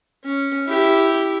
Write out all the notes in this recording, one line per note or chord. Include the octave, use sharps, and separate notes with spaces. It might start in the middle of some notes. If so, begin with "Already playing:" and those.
C#4
E4 G4